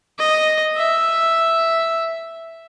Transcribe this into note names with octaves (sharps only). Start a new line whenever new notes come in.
D#5
E5